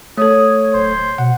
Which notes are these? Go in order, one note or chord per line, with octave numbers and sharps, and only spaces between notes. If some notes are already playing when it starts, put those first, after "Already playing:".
A3 A4 C#5 D#6
D1 C5
B2 F#5